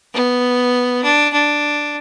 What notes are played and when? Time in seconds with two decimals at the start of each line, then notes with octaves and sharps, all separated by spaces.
0.13 B3
1.03 D4
1.33 D4